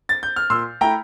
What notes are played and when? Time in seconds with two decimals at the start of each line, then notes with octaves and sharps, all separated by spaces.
0.09 A6
0.23 G6
0.36 F6
0.50 A#2 C6 E6
0.81 A3 E4 G5 A#5